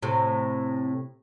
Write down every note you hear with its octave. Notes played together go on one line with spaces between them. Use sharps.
A2 C3